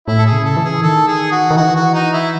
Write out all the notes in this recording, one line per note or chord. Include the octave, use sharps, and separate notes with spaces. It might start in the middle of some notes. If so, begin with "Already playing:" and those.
A2 E4
A4
G#4
C#3
A4
E3
G#4
D#3 A4
G#4
F#4
D#3
E3 F#4
F#4
D#4
E4